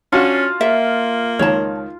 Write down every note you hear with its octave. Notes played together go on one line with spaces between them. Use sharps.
C#4 D4 F4 F#4 F#5
A#3 E5
C#2 D#3 C#5 A5